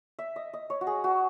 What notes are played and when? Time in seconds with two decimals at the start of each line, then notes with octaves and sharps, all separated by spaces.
0.19 E5
0.36 D#5
0.53 D#5
0.70 C#5
0.81 F#4
0.87 G#4
1.04 F#4